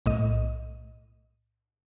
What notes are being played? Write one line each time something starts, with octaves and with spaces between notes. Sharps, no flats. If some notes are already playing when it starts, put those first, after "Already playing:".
B1 A2 D#5